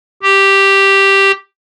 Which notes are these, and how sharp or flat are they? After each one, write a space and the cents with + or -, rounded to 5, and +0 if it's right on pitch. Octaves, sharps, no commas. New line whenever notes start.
G4 +0